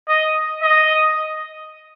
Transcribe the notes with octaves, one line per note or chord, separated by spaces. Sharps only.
D#5
D#5